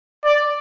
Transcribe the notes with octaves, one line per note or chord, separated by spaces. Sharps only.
D5